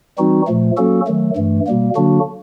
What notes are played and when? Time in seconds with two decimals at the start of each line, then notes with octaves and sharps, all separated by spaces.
0.18 E3 G3 C4 D#4 F#4
0.47 A#2 F3 A3
0.77 F#3 A#3 C#4 F#4 A4
1.07 D#3 F#3 A3
1.36 G2 E3 A3
1.67 B2 G3 A#3
1.96 D3 F#3 A#3 D4 F#4